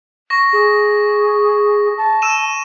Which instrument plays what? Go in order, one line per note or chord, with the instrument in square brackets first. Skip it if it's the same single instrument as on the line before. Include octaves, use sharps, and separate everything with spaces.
[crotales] C#6 A#6
[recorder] G#4
A5
[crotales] E6 D#7 E7